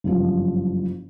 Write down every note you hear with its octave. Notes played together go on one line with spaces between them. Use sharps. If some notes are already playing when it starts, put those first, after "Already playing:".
F#1 G2 F3